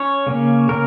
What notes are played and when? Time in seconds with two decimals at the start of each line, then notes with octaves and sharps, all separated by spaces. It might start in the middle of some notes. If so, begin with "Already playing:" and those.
Already playing: C#4 C#5
0.27 C#3 A#3 C#4
0.69 C#3 A#3 C#4 A#4